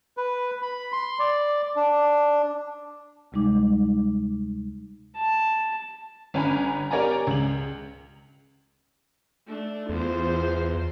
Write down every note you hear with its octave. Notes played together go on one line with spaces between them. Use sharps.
B4
B5
C6
D5
D4
D2 C3 G3 G#3 D#4 D6
A5
G1 C#4 G#5 A#5 B5
G4 A#4 C#5 D5 G#5 A#5
C#2 F#7
A3 D4
E2 F4 C5